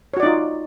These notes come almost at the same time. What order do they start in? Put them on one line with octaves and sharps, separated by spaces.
C#5 F#4 D5 D#4 F4